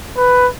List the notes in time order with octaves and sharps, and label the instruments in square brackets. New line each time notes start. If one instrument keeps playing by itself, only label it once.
[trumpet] B4